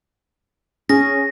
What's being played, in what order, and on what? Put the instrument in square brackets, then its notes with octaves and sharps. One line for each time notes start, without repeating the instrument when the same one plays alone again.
[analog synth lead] C#4 [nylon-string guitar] G#4 [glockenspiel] A#6